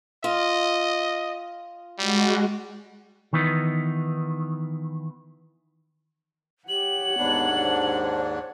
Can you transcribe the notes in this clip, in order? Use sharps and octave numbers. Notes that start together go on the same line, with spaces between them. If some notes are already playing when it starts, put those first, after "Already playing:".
F4 D#5
G3 G#3 F#4
D#3 E3 B3 D#4
G4 C#5 F#5 F#7
D#2 G#2 B3 D4
C5